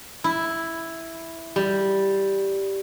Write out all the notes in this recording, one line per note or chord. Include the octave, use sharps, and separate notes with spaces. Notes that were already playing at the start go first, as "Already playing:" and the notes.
E4
G3